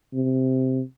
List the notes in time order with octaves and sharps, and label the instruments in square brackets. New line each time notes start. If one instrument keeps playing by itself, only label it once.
[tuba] C3